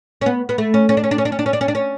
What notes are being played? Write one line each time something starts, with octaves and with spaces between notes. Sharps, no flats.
C#4
B3
B3
A3
C#4
C#4
D4
C#4
D4
C#4
D4
C#4
D4
C#4
D4
C#4
D4
C#4